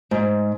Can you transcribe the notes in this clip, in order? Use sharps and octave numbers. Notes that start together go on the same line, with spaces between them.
G#2